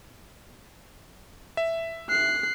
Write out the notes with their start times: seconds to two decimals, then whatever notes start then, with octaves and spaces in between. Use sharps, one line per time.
1.57 E5
2.09 F#6 C7